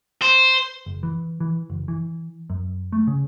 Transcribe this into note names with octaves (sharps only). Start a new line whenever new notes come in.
C5
F#1
E3
E3
F#1
E3
F#2
A3
C#3